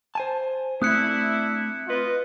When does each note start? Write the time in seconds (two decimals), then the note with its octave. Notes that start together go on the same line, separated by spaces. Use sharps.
0.15 C5 G#5 A5
0.82 A3 C4 D4 E4 D#6 F#6 C#7
1.86 F4 B4 D#5